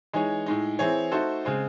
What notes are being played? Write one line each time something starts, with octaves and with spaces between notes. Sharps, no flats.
E3 G#3 D#4 G#4 C#5
A2 G#3 D#4
E3 C4 E4 G#4 C#5
A3 D#4 F#4 A4 C5
C#3 G#3 C4